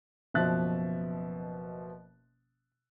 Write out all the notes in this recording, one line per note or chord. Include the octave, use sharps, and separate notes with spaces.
F#1 B2 F3 E5 F#6 A6